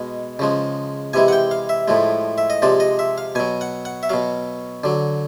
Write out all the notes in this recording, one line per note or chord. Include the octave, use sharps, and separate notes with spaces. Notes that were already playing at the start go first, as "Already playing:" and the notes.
Already playing: B2 G#3
C#3 F3 G#3
C3 E3 G#3 G#5
F#5
G5
F5
E5
A2 F3 G#3
E5
D#5
C3 F3 G#3 D5
D#5
E5
F5
B2 F#3 G#5
F#5
F#5
E5
B2 F#3 F5
D3 F#3